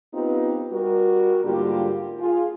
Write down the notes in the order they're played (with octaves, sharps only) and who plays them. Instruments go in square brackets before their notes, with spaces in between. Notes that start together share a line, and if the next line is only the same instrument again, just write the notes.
[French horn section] B3 C4 D#4 F4 G4 B4
G3 F#4 A#4
G#2 D3 G3 A#3 F4 G4
F4 G#4